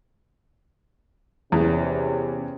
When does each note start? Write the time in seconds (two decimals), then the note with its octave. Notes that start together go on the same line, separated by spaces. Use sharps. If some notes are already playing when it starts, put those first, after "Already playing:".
1.52 E2 C3 C#4